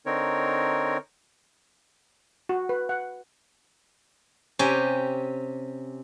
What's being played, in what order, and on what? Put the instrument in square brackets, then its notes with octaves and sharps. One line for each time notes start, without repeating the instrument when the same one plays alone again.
[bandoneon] D3 C4 D#4 A#4 C#5
[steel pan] F#4
B4
F#5
[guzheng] C3 C#4 G4 G5 G#5